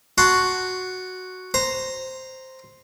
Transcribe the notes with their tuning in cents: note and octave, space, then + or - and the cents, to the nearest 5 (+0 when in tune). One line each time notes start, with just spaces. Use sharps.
F#4 +0 A5 +0 C6 +0
C5 +0 A#5 -5